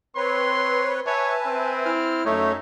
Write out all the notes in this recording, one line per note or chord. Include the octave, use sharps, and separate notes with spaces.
C4 B4 C#5 C6
B4 C#5 E5 G#5 A5
C4
E4 F6
F#2 A3 D#4 C#5 E5